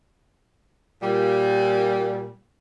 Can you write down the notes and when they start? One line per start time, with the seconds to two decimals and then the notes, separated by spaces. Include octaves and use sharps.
1.03 A#2 G3